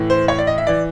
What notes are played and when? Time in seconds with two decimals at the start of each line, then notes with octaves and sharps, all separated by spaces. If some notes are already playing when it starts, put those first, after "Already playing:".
Already playing: A2 E3
0.10 C5
0.28 C#5
0.38 D5
0.47 D#5
0.58 E5
0.67 E3 D5